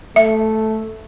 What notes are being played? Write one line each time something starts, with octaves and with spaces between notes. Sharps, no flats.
A3 E5